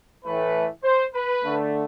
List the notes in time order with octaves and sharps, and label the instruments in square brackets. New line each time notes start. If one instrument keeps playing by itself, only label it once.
[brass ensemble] A2 E3 A3 B4
C5
B4
D3 A3